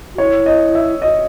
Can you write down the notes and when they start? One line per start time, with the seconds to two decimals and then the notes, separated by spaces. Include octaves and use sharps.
0.14 F#4
0.18 E4 C#5
0.46 D#5
0.75 E5
1.02 F#4 D#5